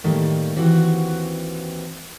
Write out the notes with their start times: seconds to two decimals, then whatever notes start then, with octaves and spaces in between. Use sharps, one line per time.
0.04 A2 D#3 G3 A3 A#3
0.56 D#2 E3 C4 F#4 F#5